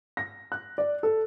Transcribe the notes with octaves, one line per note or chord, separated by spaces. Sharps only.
A#6
F#6
D5
A4